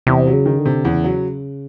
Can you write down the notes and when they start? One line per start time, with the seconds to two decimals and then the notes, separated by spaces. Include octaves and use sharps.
0.07 E2 C3
0.27 F#3
0.33 C#3
0.46 D#3
0.59 D3
0.65 C3
0.84 E2 C#3
1.04 F#3